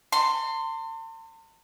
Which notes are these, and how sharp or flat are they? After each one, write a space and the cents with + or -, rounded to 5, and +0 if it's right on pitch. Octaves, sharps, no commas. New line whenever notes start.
A5 +45 C6 +0